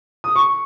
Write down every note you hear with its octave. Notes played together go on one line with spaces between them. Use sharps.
D#6
C#6